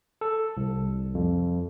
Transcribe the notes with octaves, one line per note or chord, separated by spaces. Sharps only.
A4
C2
F2